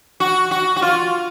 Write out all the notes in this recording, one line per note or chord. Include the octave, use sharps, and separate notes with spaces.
F#4
F#4
F#4
F4